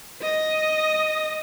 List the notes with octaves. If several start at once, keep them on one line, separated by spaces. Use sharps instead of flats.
D#5